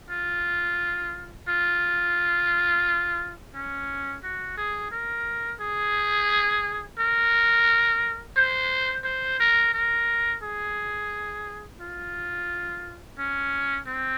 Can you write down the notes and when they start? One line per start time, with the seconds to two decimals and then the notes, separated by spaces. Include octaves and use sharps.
0.10 F4
1.48 F4
3.55 C#4
4.23 F#4
4.57 G#4
4.91 A#4
5.60 G#4
6.99 A#4
8.37 C5
9.05 C5
9.40 A#4
9.74 A#4
10.43 G#4
11.80 F4
13.18 C#4
13.87 C4